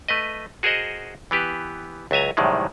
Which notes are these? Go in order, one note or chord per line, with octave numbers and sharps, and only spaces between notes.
A3 B4 D#5
F#4 G#4 A#4 C5 D#5 F#5
E3 B3 G4 B4
C#2 F#3 E5 G#5 A#5
C2 F#2 A2 D#3 E3 G#3